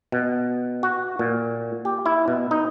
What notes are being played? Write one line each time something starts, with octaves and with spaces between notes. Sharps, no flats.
B2
F#4
A#2
G4
E4
B2
D#4